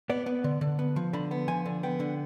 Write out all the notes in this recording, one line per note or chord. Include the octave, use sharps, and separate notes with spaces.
B3 D5
B3
D3
D3
B3
F3
D3 B5
B3
F3 G#5
D3
B3 G5
D3